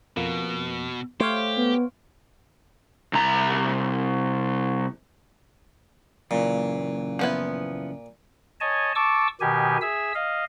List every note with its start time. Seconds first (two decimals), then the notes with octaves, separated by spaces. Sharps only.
0.17 F2 B2 A#3
1.20 A3 G4 C5 C#5 F5
1.57 B3
3.13 C2 A#5
6.31 F#2 A#2 C#3 E3
7.19 F3 B3 E4
8.60 C#5 D#5 G#5 A5
8.95 A5 C#6 D6 E6
9.40 B2 D#3 G4 G#5
9.81 G#4 E5 E6
10.15 D#5 F5